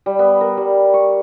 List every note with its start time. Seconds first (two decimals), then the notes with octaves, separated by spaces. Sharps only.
0.06 G3
0.19 B3
0.41 A#4
0.57 G3
0.94 C#6